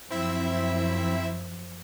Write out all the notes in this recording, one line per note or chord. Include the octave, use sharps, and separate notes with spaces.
F#2 F3 C4 E4 E5